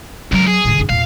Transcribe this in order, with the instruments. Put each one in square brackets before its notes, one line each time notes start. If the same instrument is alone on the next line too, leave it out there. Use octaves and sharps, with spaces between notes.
[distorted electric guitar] C#2 A#4 [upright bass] F#3
[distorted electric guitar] G#4
[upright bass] A2 D3
F#2 D#4
[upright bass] E2 A#2 [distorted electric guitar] F5